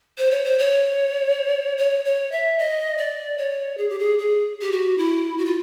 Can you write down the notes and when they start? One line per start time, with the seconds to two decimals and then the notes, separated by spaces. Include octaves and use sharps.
0.18 C5
0.31 C#5
0.44 C5
0.59 C#5
1.78 C#5
2.05 C#5
2.32 E5
2.59 D#5
2.98 D5
3.38 C#5
3.78 G#4
3.89 G4
3.99 G#4
4.19 G#4
4.61 G4
4.72 F#4
4.98 E4
5.38 F#4
5.45 F4